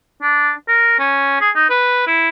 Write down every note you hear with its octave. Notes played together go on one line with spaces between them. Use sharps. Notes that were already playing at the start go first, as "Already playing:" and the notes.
D4
A#4
C#4
G#4
D#4
B4
E4